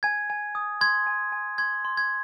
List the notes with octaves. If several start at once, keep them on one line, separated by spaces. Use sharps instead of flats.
G#5 G#6
G#5
D#6
C6 G#6
G#5
G#5
C6 G#6
C6
G#6